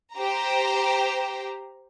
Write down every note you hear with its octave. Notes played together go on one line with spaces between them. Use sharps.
G4 C5 A#5